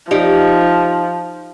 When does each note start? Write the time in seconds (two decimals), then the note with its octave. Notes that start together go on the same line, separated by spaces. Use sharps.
0.11 F3 D#4 G4 D5